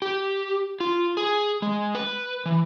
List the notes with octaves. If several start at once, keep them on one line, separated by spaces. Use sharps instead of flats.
G4
F4
G#4
G#3
B4
E3